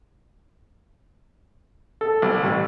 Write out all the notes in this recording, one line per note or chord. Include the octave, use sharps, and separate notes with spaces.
A4
C2
A1